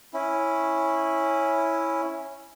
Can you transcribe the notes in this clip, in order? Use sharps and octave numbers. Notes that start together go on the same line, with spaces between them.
C#4 E4